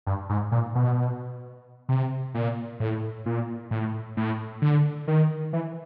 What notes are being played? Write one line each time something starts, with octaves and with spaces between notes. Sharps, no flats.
G2
G#2
A#2
B2
C3
A#2
A2
A#2
A2
A2
D3
D#3
E3